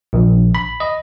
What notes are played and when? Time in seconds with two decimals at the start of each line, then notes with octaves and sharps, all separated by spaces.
0.13 A#1
0.55 B5
0.80 D#5